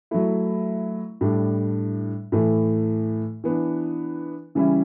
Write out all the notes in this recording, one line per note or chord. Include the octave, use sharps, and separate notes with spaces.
F#3 A3 E4
A2 G3 D4
A2 E3 A3
E3 B3 D4
C#3 E3 G3 C#4 E4